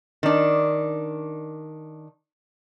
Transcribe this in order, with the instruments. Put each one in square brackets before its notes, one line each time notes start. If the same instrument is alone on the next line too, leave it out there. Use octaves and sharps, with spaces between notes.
[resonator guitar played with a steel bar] D#3 D4